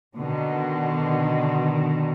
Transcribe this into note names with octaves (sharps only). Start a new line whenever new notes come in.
B2 D3 D#3